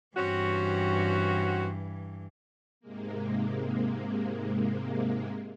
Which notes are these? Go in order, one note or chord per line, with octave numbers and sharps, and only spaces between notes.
G2 E3 C4 C#4 F#4
G#2 C3 G#3 A#3